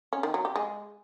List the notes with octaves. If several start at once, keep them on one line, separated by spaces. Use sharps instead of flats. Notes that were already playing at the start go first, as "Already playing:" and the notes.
C#4
D#3
F#3
G4
G#3